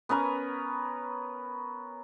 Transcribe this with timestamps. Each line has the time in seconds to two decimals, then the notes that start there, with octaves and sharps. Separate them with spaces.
0.09 B3 C#4 A#4 B4